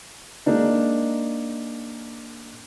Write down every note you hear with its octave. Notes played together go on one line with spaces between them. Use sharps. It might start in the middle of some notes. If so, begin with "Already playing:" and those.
G#3 A#3 D4 D#4